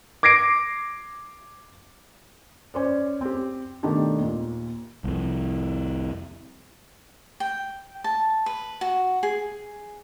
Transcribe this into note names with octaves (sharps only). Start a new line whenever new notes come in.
D6 G#6 A#6 C7 D7
C#4 C5 D5
C4 G4
B2 D#3 A3 D4 G4 A4
D#2 A#2
C2 F2
G5
A5
B4
F#4
G#4